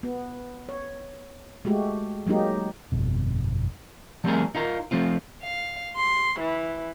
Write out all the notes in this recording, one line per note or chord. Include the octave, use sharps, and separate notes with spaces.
B3
C#5
G#3 A3 F#4 G4
F#3 G#3 A#3 D#4 G4
G1 F2 B2
F3 G3 A3 C4 G#4 A#4
D#4 F4 A#4
F3 A3 C4 F4
F5
C6
E3